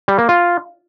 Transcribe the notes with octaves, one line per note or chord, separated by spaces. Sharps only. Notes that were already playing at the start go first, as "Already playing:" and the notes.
G3
A#3
F4